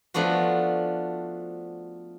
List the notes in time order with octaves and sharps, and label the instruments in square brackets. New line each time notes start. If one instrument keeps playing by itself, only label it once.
[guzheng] F3 A3 B3 D4 F#4